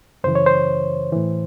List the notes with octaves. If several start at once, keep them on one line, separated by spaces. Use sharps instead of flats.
F#2 C#3 E3 C5
C#5
C5
A2 E3